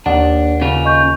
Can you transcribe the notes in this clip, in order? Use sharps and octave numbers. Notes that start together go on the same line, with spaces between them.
D#2 D4 F#5
C#3 F4
D#5 C#6 G6